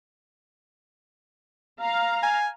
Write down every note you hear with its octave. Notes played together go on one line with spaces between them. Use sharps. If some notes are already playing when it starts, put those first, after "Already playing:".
F5 A#5
G#5